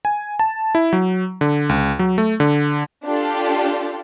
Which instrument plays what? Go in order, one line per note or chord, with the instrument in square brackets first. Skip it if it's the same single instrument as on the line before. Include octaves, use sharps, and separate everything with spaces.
[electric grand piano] G#5
A5
E4
F#3
D3
C#2
F#3
A3
D3
[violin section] D4 F4 G4 A4